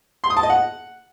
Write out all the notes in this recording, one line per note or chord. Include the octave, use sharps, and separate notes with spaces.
C6
D#6
A5
D#5
F#5